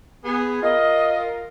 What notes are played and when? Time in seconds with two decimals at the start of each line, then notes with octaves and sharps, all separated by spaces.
0.24 B3 G#4
0.62 F4 A#4 D#5